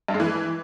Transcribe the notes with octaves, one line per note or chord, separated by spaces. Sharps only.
G2
G#3
E3